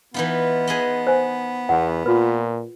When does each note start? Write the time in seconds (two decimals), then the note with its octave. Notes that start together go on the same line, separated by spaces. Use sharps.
0.14 E3 B3 D#4 F4
0.67 G#4 B4 D#5
1.07 C5 G#5
1.69 E2 F#5
2.06 A#2 F4 B4